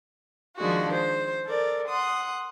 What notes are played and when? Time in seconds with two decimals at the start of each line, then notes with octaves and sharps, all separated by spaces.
0.57 D#3 F3 G#3 D4 F#4
0.92 C5
1.45 A4 A#4 D5
1.88 F#5 C6 D#6